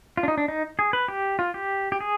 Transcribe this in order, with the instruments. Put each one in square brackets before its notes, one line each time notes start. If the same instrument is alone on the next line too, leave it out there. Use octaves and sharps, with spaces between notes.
[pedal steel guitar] F4
D4
D#4
D4
D#4
G#4
B4
G4
F4
G4
G4
G#4